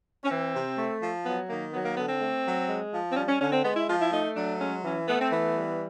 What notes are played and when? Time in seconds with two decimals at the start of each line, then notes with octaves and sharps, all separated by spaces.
0.24 C#4
0.29 E3 C4
0.53 C3
0.78 A3
1.01 F3
1.25 F#3 B3
1.49 D#3 A#3
1.73 F#3 B3
1.85 A#3
1.97 D3 B3
2.09 C4
2.21 A3
2.45 F#3
2.69 G#3
2.93 F3
3.11 C4
3.17 G3 C#4
3.29 C#4
3.41 D3 C#4
3.52 C4
3.64 G#3 B3
3.76 E4
3.89 F3 F4
4.01 E4
4.12 A3 D#4
4.36 F#3 D4
4.60 G#3 C#4
4.84 E3 C#4
5.08 A3 B3
5.21 C4
5.32 E3 B3
5.56 G3